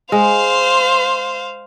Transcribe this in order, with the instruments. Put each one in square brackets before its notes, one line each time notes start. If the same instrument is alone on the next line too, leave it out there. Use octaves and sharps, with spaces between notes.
[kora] G#3 [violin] C5 F5